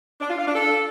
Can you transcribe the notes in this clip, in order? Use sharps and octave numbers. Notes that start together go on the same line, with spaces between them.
D4
F4
F5
D4
A4